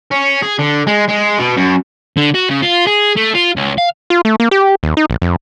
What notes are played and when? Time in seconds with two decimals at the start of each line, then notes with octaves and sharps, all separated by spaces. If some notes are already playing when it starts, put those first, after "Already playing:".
0.11 C#4
0.42 G#4
0.59 D3
0.87 G#3
1.09 G#3
1.39 B2
1.57 F#2
2.17 D3
2.34 F#4
2.50 C#3
2.62 F4
2.87 G#4
3.17 A3
3.34 F4
3.56 C#2
3.78 F5
4.10 F4
4.25 A3
4.40 A#3
4.51 G4
4.83 D#2
4.97 D#4
5.10 A#1
5.22 F2